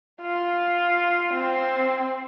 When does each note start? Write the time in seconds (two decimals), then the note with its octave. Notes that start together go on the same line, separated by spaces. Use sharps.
0.22 F4
1.34 C4